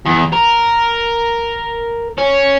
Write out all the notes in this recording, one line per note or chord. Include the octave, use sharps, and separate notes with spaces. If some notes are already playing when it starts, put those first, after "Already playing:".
E2
A#4
C#4